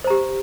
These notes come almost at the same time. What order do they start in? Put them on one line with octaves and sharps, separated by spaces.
C5 A#5 G4